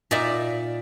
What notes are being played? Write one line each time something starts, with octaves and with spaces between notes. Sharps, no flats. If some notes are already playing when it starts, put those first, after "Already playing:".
A#2 D#4 A#4 D5 E5